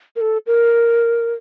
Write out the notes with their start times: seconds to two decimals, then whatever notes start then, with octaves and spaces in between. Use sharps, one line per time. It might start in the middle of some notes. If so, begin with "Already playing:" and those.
0.16 A#4
0.21 A4
0.47 A#4